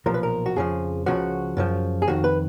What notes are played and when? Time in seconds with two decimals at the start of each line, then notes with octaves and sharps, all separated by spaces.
0.06 B1 A#2 F3 A#4
0.14 B4
0.23 A#4
0.46 F#4
0.56 F2 C#3 F3 G#4
1.06 C#2 C#3 F3 F#4
1.57 F#2 C#3 F3
2.02 G#4
2.08 F2 D#3 F#4
2.24 B4